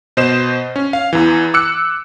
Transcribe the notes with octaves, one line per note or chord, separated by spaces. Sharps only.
B2 C5 D#5 E7
C#4
F5
E2 E3
D6 E6 F#6 C#7